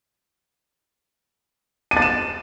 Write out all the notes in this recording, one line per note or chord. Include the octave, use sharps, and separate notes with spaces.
D#7
A6
E7